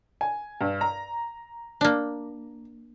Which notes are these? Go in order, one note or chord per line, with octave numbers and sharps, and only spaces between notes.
G#5
G2
A#5
A#3 D4